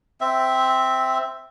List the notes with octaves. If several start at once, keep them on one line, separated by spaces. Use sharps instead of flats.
C4 E5